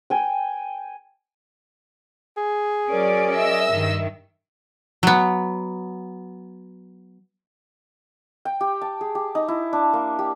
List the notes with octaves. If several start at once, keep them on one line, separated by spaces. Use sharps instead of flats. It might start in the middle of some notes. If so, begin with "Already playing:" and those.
G5 G#5
G#4
F#3 C#4 A#4 D5
D#5 E5 E6
G2 D#3
F#3 B3
G5
G4
A5
G#4
G4
D#4
E4
D4
A#3
G4